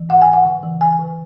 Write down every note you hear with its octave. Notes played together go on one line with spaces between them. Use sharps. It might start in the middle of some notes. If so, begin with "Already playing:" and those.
Already playing: E3
G#2 F#5
G#5
G#2
F#5
C#3
E3
E3 G#5
C#3